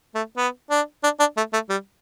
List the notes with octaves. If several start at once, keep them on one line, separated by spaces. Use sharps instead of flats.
A3
B3
D4
D4
D4
A3
A3
G3